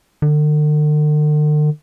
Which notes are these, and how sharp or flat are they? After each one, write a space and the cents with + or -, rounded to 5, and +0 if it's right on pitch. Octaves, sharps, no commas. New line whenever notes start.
D3 +45